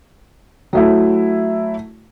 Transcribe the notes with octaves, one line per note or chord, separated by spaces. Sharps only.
F#3 A3 E4